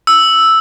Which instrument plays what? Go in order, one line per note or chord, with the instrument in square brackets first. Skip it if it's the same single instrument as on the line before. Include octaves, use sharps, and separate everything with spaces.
[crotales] E6